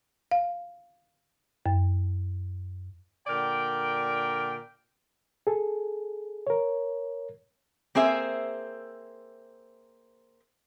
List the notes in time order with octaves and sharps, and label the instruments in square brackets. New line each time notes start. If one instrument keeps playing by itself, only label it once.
[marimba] F5
F#2
[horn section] A#2 D3 A#4 D5 G5
[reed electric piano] G#4 A4
A#4 C#5
[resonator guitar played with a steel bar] A#3 C4 G#4 C5 E5